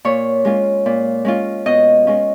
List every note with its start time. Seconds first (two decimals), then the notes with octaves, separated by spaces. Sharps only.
0.05 A#2 C#5
0.45 G#3 C#4 F4
0.86 A#2
1.25 G#3 C#4 F4
1.66 B2 D#5
2.07 G#3 C#4 F4